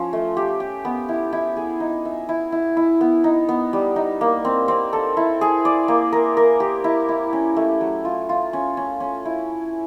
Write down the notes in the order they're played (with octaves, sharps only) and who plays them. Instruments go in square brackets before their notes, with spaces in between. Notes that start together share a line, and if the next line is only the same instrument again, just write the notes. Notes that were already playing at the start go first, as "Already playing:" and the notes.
Already playing: [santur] F3 C#4
A3
G4
G4
B3
E4
E4
G#4
D#4
E5
E4
E4
E4
B3
D#4
B3
G3
D#4
A#3
C4
C4
A4
E4
G#4
D5
A#3
A#4
A#4
G4
E4
E4
C#4
A3
F#3
F4
F4
C#4
C#4
C#4
E4